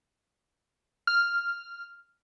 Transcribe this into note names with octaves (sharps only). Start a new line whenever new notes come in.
F6